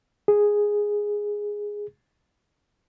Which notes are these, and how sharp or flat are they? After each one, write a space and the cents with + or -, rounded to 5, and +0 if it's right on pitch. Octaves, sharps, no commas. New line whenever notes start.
G#4 -5